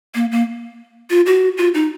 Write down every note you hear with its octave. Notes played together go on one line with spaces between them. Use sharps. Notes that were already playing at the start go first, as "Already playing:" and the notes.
A#3
A#3
F4
F#4
F4
D#4